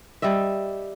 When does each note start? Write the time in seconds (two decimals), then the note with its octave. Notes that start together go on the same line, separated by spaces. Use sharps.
0.22 G3 G4 D#5 E5